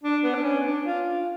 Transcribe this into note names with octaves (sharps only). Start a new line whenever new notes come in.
D4
B3
D4
C#4
D4
F4